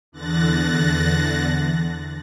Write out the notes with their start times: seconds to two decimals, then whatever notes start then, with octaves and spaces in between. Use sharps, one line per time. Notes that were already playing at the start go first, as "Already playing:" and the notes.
0.12 E2 D3 F#6 A6 A#6